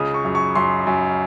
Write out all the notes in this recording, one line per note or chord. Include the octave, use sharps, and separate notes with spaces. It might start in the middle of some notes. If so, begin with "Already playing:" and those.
Already playing: C#2 C#3 D#6
C#6
F#2
C#6
F#2 C6
F#2